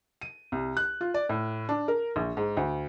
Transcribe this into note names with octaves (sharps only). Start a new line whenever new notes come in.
D#7
C2
F#6
F4
D5
A2
D4
A#4
A#1
G#2
D2